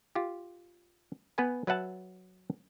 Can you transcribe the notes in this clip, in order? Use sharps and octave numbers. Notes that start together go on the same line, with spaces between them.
F4 G4
B3 B4 G#5
F#3 B4 E5 F#5 A5